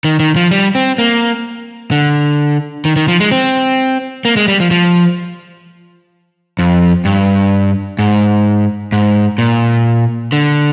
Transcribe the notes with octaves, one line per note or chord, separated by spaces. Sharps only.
D#3
D#3
F3
G3
C4
A#3
D3
D#3
D#3
F3
G#3
C4
A#3
G#3
G3
F3
F3
F2
G2
G#2
G#2
A#2
D3